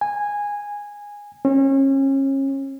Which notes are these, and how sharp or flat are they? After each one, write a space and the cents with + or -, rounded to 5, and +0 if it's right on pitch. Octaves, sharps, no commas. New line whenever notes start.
G#5 -10
C#4 -35